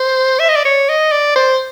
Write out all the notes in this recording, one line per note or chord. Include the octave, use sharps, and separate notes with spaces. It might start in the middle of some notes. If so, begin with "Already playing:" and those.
Already playing: C5
E5
D#5
D5
C#5
D#5
D5
C5